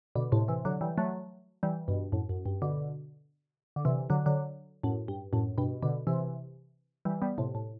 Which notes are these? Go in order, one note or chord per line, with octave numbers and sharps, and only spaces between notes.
B2 D3
A2 C3
C3 E3
D3 F#3
E3 G3
F#3 A3
E3 G3
G2 B2
F#2 A2
F#2
G2
B2 D3
D3
C3 E3
D3 F#3
D3 F#3
F#2 A2
G2
F#2 A2
G2 B2
B2 D3
C3 E3
E3 G3
G3 B3
A2 C3
A2